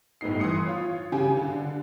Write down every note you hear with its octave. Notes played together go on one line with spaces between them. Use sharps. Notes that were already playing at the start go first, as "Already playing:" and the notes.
G1 A2 B3 D#4 C7
E3 C6 D#6 C#7
F4 C#5
C#3 G4 G#5
D3